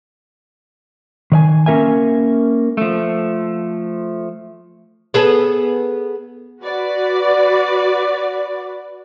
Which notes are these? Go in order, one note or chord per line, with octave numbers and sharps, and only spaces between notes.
D#3 D5 G#5
A#3 C#4 D4 A#4 E5 G#5
F3 A3
B3 G#4 A4
F#4 B4 D5